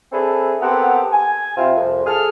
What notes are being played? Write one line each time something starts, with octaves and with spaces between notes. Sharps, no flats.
C4 D4 E4 G#4 A4 B4
B3 C4 G4 A4 A#4 F#5
G#5
C3 C4 E4 F4
C2 F2
G#4 A4 F6